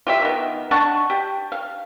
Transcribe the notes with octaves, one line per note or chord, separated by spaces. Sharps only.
F4 G4 E5
D#3 B3
D4 F#5 A5 C#6
G4
F5